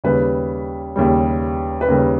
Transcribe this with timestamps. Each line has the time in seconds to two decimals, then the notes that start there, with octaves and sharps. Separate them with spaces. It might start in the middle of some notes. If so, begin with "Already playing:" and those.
0.04 D#2 C#3 G3 B4
0.96 D#2 C#3 G3
1.81 B4
1.88 D#2 C#3 G3 A#4